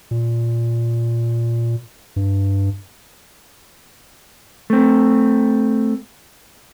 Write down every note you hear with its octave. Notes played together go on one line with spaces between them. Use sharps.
A#2
G2
A3 C4